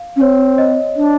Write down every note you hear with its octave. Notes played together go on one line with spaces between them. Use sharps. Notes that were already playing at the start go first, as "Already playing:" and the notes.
Already playing: F5
C#4
C4 C#5
D#5
D4